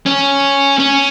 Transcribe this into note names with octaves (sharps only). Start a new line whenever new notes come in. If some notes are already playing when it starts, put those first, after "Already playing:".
C#4
C#4